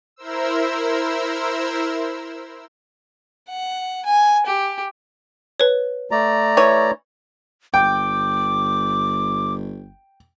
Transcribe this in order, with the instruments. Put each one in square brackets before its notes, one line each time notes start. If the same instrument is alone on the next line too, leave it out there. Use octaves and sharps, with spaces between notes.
[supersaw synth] E4 A#4 C5 E6
[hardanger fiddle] F#5
G#5
G4
[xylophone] B4 C#5
[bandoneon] A3 D5 A#5
[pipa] E3 C#5
[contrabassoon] G1 [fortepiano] G5 [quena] D6